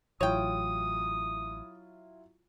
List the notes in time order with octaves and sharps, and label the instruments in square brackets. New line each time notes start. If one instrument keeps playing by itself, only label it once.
[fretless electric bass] A1 [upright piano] F#3 E4 F4 [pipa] C#5 G5 [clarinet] D#6